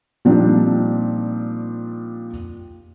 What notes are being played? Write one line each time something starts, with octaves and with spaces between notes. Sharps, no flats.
A#2 F3 G3 C4 D4 D#4